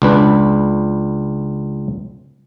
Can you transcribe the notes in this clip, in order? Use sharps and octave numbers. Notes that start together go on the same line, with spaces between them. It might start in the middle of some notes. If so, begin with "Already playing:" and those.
C#2 D4 B4